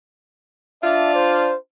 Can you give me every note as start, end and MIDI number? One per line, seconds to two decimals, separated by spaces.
0.83 1.52 62
0.83 1.52 65
0.83 1.52 74
0.83 1.13 76
1.14 1.57 72